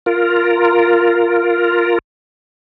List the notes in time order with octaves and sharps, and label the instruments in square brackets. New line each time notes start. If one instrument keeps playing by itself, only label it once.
[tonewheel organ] F4 A#4